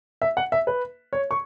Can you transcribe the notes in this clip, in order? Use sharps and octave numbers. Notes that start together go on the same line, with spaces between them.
E5
F#5
E5
B4
C#5
C#6